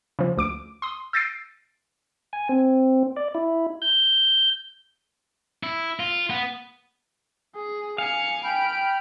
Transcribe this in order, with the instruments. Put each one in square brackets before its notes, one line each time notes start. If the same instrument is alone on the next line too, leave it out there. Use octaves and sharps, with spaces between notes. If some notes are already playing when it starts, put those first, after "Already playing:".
[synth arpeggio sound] C#3 F3
D2 D6 D7
C6 D#6
E6 G6 A6 A#6 C7 D7
[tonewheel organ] G#5
C4
D5
E4
G6
[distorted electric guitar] E4
F4
B3
[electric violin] G#4
[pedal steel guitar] F5 [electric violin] G#5 C#7
[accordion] G5 B5 F6 [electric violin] D7